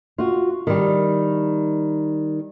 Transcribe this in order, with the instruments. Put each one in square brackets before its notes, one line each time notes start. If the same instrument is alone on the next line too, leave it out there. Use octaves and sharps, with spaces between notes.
[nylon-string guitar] F4 F#4
D#3 G3